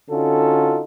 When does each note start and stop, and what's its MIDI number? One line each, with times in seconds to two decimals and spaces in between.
0.10 0.83 50
0.10 0.83 61
0.10 0.83 63
0.10 0.83 65
0.10 0.83 66
0.10 0.83 69